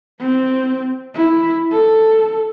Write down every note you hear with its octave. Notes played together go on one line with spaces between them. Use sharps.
C4
E4
A4